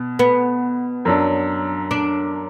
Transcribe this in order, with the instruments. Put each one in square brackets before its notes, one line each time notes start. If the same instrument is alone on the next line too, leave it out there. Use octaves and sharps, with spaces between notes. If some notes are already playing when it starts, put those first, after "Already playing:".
Already playing: [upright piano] B2
[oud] B3
[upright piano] F#2 F#3 D4
[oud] D4